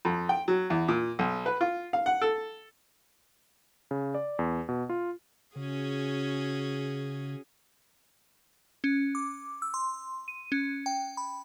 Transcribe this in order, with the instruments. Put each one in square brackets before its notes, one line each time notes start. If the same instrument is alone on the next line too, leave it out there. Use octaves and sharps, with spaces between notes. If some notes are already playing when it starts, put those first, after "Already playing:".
[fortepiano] F2
G5
F#3
E2
A#2
B1
B4
F4
F5
F#5
A4
[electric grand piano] C#3
D5
E2
B2
F4
[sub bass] C#3 [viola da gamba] C#4 F#4 G#4
[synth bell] C#4
D6
E6
C6
D#7
C#4
G5
B5